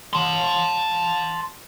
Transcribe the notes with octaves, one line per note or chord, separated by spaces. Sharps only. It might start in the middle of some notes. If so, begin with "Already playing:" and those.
A5 C6